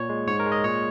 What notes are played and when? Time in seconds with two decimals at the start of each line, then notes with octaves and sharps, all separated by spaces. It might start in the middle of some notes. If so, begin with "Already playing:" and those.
Already playing: A#2 C#5
0.09 G#3
0.27 G#2 C#5
0.40 A#4
0.46 G#3
0.52 D#5
0.64 A#2 C#5